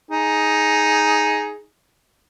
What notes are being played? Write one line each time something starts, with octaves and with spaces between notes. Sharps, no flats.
D#4 G#4